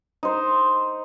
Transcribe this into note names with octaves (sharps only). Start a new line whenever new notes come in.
D#4 C5